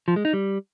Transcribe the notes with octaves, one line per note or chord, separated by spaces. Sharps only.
F3
G#3
D#4
G3